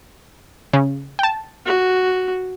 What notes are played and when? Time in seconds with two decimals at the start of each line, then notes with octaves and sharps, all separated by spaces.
0.73 C#3
1.19 G5 A5
1.66 F#4